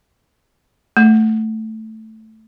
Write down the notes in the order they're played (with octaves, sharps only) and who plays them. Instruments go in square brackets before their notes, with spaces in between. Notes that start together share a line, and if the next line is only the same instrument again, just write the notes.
[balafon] A3